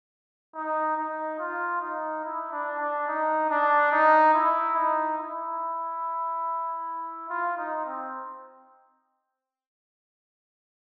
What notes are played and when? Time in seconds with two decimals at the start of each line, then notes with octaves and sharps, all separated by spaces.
0.55 D#4
0.97 D#4
1.39 F4
1.82 D#4
2.24 E4
2.52 D4
2.80 D4
3.08 D#4
3.50 D4
3.92 D#4
4.34 E4
4.77 D#4
5.18 E4
7.30 F4
7.58 D#4
7.86 C4